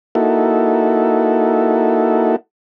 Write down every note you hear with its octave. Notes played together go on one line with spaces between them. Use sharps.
A#3 D#4 E4 F#4 A4